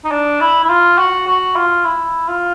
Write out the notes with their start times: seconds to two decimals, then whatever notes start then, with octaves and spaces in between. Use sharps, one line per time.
0.04 D#4
0.11 D4
0.41 E4
0.64 E4
0.69 F4
0.98 F#4
1.27 F#4
1.56 F4
1.85 E4
2.28 F4